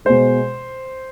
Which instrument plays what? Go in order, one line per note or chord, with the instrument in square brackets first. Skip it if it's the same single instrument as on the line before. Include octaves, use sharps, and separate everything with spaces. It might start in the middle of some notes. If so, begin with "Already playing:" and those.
[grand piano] B2 G#3 C5